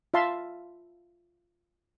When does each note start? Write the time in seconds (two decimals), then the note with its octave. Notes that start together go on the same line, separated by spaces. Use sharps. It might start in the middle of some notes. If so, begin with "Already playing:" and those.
0.14 F4 E5 F5 A5 C6